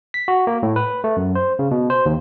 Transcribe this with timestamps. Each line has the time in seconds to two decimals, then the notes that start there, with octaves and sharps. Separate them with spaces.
0.14 B6
0.28 F#4
0.47 A#3
0.63 A2
0.76 B4
1.04 A3
1.17 F#2
1.35 C5
1.59 C#3
1.71 B2
1.90 C5
2.06 D#2